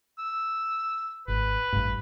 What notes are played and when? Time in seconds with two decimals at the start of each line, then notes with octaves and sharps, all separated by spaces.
0.19 E6
1.28 G#1 B4
1.73 A1 G2